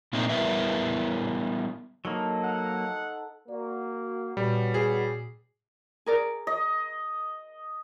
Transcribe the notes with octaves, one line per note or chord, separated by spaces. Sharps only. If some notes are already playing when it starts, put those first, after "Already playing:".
A#2 A3 A#3 C4 D#4
G3 B3 E4 A#4 B4 E5
F#3 A#3 D#4 A4 C5
F#5
A#3 F#4 D5
A#2 G3 B3 C#4 F#4
G#4
G#4 A#4 D5
D#5